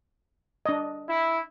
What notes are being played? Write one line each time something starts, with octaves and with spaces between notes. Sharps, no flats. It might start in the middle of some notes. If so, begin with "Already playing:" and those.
D4 D#5
E4